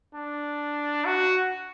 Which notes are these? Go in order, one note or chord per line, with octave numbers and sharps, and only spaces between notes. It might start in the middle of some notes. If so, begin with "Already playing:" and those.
D4
F#4